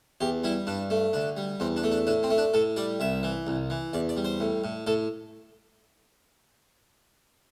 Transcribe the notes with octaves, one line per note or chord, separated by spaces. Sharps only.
E2 G4
G3 E4
G2 D4
A3
D2 D4
G3
E2 C4
D4
A3
D4
A2 D4
C4
A3
D4
A2 A4
G3 D5
C2 E5
E3
C2
E3
E2 D5
D5
G3
C5
A2
A2
A2 A4